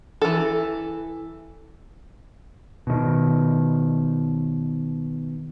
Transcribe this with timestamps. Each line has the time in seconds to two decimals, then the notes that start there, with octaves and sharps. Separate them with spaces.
0.22 E3 A4
2.87 B2 D#3